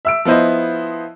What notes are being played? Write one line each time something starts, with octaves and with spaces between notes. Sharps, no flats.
E5 E6 D7
F3 B3 E4 C5 D#5